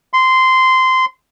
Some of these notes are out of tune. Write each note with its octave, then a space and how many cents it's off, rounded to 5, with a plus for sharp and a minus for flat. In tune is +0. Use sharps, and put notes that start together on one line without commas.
C6 -15